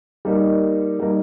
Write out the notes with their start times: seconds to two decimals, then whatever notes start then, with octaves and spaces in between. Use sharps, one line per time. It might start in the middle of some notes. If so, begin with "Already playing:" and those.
0.25 G3 A#3 D#4 A#4
0.99 G3 A#3 D#4 A#4